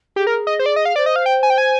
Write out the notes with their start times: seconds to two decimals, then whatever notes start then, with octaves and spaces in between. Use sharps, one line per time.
0.16 G4 G#4
0.27 A#4
0.47 D#5
0.59 C5
0.66 D5
0.76 D#5
0.85 F5
0.96 C5 D5
1.06 D#5
1.16 F5
1.26 G5
1.43 G#5
1.50 G5
1.58 G#5